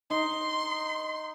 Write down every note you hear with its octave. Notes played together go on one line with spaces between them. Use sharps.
D#4 C6